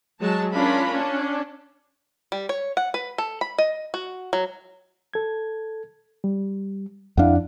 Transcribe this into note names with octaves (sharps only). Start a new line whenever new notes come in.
F#3 G#3 A5
C#4 D4 F4 A#4 B5
C#4 D4
G3
C#5
F#5
B4
A4
B5
D#5
F#4
F#3
A4 G#6
G3
F2 D4 E4 F5 F#5